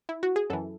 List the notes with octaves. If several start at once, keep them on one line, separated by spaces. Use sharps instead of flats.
E4
F#4
G#4
F#2 E3 A4